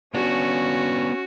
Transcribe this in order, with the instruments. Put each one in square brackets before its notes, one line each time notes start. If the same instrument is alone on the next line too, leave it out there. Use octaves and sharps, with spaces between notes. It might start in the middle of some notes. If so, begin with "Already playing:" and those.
[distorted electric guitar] B3 D4 [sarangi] C#4 [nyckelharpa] F#4